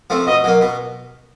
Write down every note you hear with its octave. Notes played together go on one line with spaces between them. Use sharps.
F3 A3 C4
B2 D#5
F#3 A#3
B2